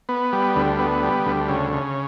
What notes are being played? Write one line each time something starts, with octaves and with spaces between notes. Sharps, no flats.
B3
G3
D2
B3
G3
D2
C#3
C#3